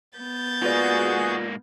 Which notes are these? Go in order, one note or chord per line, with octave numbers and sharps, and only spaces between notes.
B3 G6 A6
G#2 A#3 F4 F#4 G#4 B4 D5